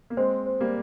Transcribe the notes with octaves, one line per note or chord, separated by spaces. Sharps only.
A#3
G#3 C4 C5
C5
G3 A#3